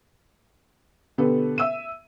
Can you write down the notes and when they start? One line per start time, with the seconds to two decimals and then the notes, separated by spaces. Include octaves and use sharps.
1.18 B2 D3 B3 G4 A4 B4
1.58 E5 E6 D#7